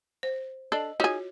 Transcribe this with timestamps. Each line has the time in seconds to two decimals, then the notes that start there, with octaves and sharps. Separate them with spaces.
0.23 C5
0.72 D4 A4 D#5
1.00 D#4 F4 F#4 G#4 C#5